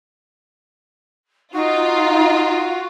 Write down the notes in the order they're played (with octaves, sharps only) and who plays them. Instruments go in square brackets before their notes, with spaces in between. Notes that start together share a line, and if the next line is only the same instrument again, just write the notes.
[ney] D#4 [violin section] F4 [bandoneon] F#4